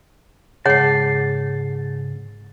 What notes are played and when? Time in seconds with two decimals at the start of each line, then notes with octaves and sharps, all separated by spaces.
0.66 G#2 C#3 G#4 C#5 F#5 A5 C7